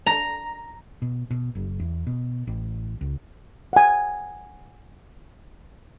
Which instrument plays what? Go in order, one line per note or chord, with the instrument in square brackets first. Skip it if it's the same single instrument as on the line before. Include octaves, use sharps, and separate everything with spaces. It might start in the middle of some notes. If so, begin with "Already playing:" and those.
[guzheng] A#5
[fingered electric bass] B2
B2
F#1
E2
B2
A1
C#2
[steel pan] F#5 G#5